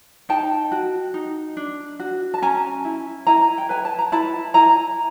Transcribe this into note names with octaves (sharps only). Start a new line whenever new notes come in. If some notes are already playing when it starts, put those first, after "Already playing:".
D#4 G5 A5
F#4
D#4
D4
F#4
A5
C#4 G#5 A#5
E4
E4 G#5 A#5
G5
B4 G#5
A5
A#5
E4 A5 B5
E4 G#5 A#5